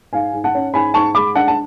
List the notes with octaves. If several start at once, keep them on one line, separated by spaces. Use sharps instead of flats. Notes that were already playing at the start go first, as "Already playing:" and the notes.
G#2 F5 G#5
G#2
F#5 A5
C#4
G#2 G#5 B5
G#2 A5 C#6
G#3 B5 D6
D4 F#5 A5
A5